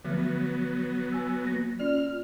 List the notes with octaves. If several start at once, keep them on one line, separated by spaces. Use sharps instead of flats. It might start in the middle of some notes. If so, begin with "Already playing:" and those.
D3 F3 F#3 A3 B3
G#5 E6
A#3 A#6
C#4 F4 D5 F6
F4